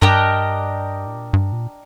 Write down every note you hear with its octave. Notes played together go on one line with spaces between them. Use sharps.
G2 D4 G4 A#4 D#5
A2
A#2
G2
A#2